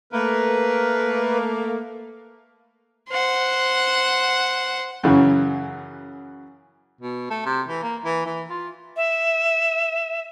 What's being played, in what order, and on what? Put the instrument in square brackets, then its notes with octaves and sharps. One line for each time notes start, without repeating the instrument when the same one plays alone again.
[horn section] A3 A#3 [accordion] A#4 B4
[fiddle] C5 F#5
[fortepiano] F#2 C#3 E3 F#3
[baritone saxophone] B2
A3
C3
E3
A#3
E3
E3
F4
[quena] E5